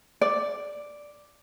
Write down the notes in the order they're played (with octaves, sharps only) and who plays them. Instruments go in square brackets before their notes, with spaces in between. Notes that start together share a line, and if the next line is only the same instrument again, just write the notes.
[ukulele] D5